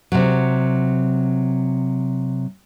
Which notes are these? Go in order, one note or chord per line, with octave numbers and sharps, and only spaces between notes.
C3 F#3